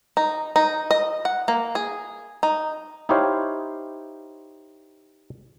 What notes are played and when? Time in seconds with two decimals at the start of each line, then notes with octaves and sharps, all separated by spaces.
0.17 D#4
0.56 D#4
0.91 D#5
1.25 F#5
1.48 A#3
1.75 G#4
2.43 D#4
3.09 D#4 E4 G4 C5 C#5 F5